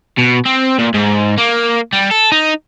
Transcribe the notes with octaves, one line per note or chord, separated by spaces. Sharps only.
B2
C4
A#2
G#2
A#3
G3
A4
D#4